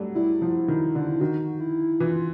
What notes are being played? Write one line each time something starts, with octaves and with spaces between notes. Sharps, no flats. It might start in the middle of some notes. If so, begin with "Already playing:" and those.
Already playing: F#3 G3 A3
G3 E4
F3
D#3
D3
D#3 F#4
E4
E3 F4